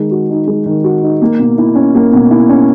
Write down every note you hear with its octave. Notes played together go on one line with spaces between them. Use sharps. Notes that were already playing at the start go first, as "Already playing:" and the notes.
Already playing: D#3 G#3
F#4
D#4
G#3
D#3
F#4
D#4
A#3
B2
E4
C#4
A#3
B2
E4
C#4